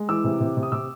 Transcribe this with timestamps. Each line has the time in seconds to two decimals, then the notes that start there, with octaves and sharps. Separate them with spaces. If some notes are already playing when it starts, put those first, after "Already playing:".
Already playing: G#3
0.09 E3 D6 E6
0.24 C3
0.41 C3
0.57 C3
0.63 D#6
0.72 C3 D6 E6